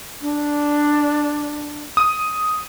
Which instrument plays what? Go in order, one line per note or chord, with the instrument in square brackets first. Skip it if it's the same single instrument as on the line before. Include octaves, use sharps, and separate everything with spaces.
[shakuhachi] D4
[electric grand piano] D#6